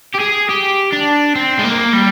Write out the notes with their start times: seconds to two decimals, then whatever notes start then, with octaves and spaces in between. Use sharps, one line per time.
0.14 G4
0.19 G#4
0.49 G4
0.92 D4
1.36 C4
1.59 G#3
1.64 A#3
1.93 G3